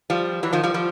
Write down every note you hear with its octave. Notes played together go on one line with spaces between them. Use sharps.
F3 G3
E3 F#3
D#3 F3
F3 G3
F3 G3